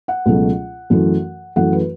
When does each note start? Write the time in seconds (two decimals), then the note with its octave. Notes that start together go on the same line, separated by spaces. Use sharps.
0.08 F#5
0.26 C#2 B2 F#3 A3
0.90 F#2 E3 A3
1.56 F#2 E3 A3 F#5
1.73 B4